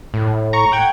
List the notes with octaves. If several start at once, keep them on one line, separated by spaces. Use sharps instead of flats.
A2
A#5 C#6
F#5 G5 G#6